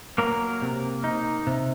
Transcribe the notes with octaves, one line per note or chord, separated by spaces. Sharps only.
F#3 A#3 A#4
C3
D#4
C3